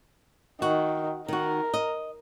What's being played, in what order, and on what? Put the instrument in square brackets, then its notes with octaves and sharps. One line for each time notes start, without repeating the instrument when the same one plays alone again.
[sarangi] D#3 [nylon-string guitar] F#4
[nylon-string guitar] D#3 F#4 [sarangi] A#4
[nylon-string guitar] D#5